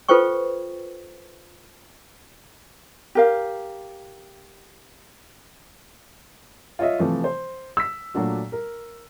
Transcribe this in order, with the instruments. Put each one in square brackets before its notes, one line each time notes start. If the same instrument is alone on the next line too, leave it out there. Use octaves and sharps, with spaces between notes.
[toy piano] F4 A4 B4 C5 G5 C#6
[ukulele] G4 A#4 F5
[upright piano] F4 C#5 D#5 E5
C3 E3 F3 A3
C5
E6 B6
A#2 F#3 A3 D4 F#4
A#4